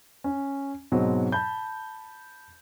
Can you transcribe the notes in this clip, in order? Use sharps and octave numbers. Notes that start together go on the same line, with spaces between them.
C#4
G#2 B2 F#3 C4 D#4
A5 B5 G6